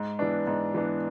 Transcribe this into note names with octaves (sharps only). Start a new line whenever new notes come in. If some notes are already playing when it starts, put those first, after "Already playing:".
Already playing: G#2
E3 B3 D4
G#2
E3 B3 D4